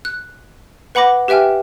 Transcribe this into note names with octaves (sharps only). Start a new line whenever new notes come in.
F#6
B4 F#5 B5 D6 A#6
G4 B4 E5 G5 G#5 F6